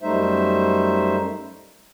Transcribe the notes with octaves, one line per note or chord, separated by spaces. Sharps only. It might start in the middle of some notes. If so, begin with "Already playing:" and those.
F#2 G3 A3 D#4 C5 E5